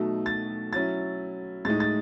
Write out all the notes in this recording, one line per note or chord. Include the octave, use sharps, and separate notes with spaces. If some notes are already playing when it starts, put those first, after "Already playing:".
Already playing: B2 F#3 A3 D#4
A6
F#3 C#4 E4 A6
A2 G#3 D#4 A6
A6